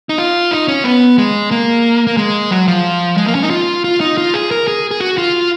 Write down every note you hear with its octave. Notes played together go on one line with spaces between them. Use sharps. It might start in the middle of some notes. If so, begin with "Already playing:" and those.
D#4
F4
D#4
C#4
B3
G#3
A#3
A#3
G#3
F#3
F3
G#3
A#3
C#4
D#4
F4
F4
D#4
F4
G#4
A#4
G#4
G#4
F#4
F4